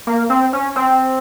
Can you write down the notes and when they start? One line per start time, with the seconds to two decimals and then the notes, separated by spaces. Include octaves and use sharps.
0.07 A#3
0.30 C4
0.53 C#4
0.76 C4